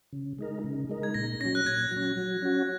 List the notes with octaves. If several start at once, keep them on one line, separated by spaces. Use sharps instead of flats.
C#3
G#3 D#4 A#4
C#3
G#3 D#4 A#4
G#6
A#2 A#6
F#3 C#4 A#6
F#6
A#2 G#6
F#3
C#4
F#3
C#4 F#4